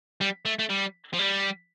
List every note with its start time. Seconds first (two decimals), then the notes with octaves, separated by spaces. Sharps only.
0.21 G3
0.45 A3
0.59 A3
0.69 G3
1.13 F3
1.19 G3